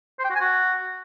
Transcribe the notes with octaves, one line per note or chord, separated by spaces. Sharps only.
C5
G5
F#4
G#5
F#4